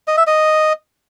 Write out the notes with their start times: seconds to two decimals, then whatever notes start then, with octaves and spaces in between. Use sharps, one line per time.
0.08 D#5
0.17 E5
0.27 D#5